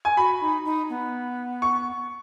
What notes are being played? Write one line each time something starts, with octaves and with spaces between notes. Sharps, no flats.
G#5
F#4 B5
D#4
D#4
B3
C#6